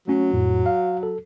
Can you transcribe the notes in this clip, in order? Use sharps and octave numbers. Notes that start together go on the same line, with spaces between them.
F#3 A3 C#4
F2 A2
F5
A4